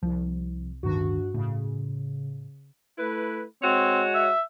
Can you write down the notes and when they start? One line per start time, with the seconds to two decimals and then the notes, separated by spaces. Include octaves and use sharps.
0.03 C2 F3
0.83 D1 G1 G2 D#3 F#4
1.34 A2 C#3
2.98 A3 E4 B4
3.63 G#3 C4 F#4 C#5
4.14 E5